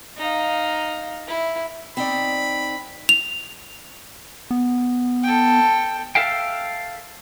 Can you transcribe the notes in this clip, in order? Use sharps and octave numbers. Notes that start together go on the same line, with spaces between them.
D#4 F5
E4
C4 D#4 D5 B5
F7
B3
A4 G5
A4 E5 F5 G5